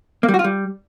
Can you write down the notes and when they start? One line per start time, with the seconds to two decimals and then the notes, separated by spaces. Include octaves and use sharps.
0.23 A#3
0.28 G3
0.34 F#4
0.39 F4
0.44 G3